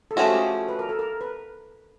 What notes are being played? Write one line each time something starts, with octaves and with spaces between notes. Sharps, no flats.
A4
F3 A3 C#4 F#4 G#4
G4
G#4
B4
A#4
A4
A#4
B4